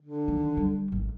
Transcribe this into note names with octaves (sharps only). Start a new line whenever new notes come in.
D3
D#3
G3
G#1